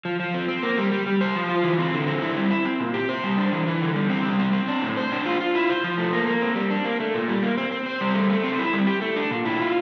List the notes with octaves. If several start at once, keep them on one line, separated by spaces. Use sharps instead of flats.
F3
F3
C4
C4
A#3
G3
G3
G3
C5
F3
F4
E3
C4
D3
C4
E4
G3
E4
C4
A#2
G4
C5
G3
D4
E3
E3
D3
G3
C4
G3
C4
C4
D4
A2
C5
D4
F4
F4
E4
C5
F3
A3
A#3
A#3
C4
G3
D4
A#3
A3
A#2
G3
A#3
C4
C4
C5
G3
A3
A3
C4
E4
G3
G4
A3
D4
A#2
E4
F4